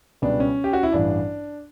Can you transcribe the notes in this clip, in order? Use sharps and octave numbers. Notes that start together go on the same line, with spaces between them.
C#2 B2 G3 B3 D4
C#4
G4
F#4
E4
A1 G2 E3 D4